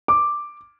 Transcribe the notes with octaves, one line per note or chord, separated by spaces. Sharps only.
D6